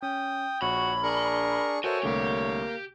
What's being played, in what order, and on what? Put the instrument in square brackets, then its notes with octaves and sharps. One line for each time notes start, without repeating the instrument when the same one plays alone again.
[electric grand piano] C#4 [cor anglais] G5 [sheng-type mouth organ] D#6
[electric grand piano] A#1 [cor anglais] F#4 [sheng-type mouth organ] C#5 [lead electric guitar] B5
[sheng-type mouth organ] D4 G#4 C#6 [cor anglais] A#4
[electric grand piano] F#4 A#4 E5 [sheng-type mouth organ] A4 C5 [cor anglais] C#5 [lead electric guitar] D#5 G#5
[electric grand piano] C2 D3 A3 [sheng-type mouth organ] A#3 [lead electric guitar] G4 G5